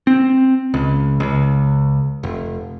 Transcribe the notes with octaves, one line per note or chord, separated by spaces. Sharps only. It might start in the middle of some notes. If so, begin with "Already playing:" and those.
C4
C#2
C#2
F1